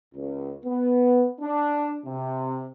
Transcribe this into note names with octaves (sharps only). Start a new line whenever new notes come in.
C#2
B3
D4
C3